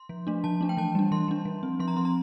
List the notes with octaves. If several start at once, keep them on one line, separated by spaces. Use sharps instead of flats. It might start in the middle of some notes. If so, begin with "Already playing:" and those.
Already playing: C6
F3
A3 D4
F3 A5
A3 D4
G5
E3 A5
G3 D4
E3 C6
G3 D4
F3
C4
F3 C6
A#5
C4 C6
A#5